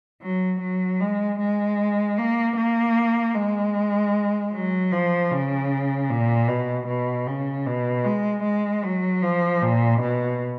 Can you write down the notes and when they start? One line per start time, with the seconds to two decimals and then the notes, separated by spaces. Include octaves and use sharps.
0.22 F#3
0.60 F#3
1.00 G#3
1.39 G#3
2.18 A#3
2.57 A#3
3.35 G#3
4.53 F#3
4.92 F3
5.32 C#3
6.10 A#2
6.48 B2
6.88 B2
7.27 C#3
7.66 B2
8.05 G#3
8.44 G#3
8.83 F#3
9.23 F3
9.62 A#2
10.02 B2